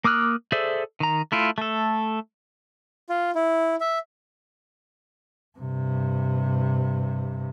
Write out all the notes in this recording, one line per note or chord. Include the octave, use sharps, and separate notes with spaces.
A#3 D6 D#6 F6 F#6
G#4 A4 C5 D5 E5
D#3 A#5
A3 E4 F4
A3 A4
F4
E4
E5
G2 C3